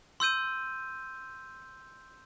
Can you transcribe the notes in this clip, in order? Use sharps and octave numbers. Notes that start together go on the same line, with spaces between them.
C6 E6 G6 D#7